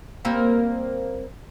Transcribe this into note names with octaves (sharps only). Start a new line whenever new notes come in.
G3 A#3 C4